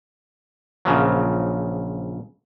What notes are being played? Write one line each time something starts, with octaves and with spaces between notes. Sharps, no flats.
A#1 C#3 F3 F#3